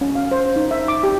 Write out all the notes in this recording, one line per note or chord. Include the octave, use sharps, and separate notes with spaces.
C#4
F5
C5
D#4
E5
D6
G4